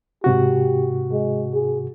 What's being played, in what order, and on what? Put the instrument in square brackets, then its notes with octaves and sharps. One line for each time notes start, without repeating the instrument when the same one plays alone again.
[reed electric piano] G#2 C3 F#4 [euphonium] G4
[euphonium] G#3
G#4